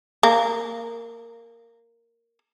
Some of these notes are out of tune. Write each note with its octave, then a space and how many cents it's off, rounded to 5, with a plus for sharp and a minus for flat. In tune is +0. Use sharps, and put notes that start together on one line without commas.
A#3 -10